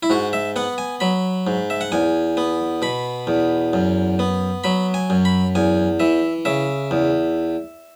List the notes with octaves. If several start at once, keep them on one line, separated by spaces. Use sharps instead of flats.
E4
G#2 F#4
E5
B3 F#5
G#5
F#3 B5
G#2
E5
F#5
E2 G#5
B3
B2 B5
E2
F#2
B3
F#3 B5
G#5
F#2
B5
E2 G#5
E3 E5
C#3 E5
E2